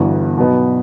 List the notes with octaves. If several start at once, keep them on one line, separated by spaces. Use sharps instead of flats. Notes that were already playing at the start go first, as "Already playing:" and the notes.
Already playing: G1 G2 E3 B3 F#4
B2 F#3 B3 D#4